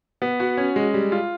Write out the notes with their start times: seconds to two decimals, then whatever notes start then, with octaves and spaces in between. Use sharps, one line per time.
0.22 B3
0.40 F#4
0.57 C#4
0.76 G#3
0.94 G3
1.12 F4